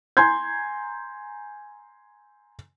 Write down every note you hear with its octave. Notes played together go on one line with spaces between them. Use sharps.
G#5 A#5 C6 G6 G#6